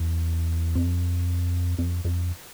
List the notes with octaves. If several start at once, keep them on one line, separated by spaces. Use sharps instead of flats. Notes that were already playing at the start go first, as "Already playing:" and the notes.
Already playing: E2
F2
F2
F2